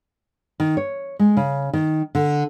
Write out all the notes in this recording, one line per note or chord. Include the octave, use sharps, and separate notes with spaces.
D#3
C#5
G#3
C#3
D#3
D3